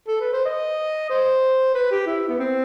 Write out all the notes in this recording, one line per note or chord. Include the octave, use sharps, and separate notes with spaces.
A4
B4
C5
D#5
C5
B4
G4
E4
B3
C4